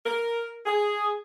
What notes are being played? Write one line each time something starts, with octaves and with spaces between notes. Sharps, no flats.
A#4
G#4